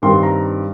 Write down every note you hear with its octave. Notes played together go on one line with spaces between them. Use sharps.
G2 D#3 G3 C4 C6
A#5